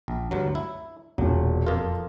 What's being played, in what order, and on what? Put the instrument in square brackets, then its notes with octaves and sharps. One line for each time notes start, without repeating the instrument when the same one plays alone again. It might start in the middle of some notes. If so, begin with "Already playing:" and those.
[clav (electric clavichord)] A#1
D2 G2 F#3
E4
[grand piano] E1 A#2 [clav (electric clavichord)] F#3
[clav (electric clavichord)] F2 F4 [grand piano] A4 A#4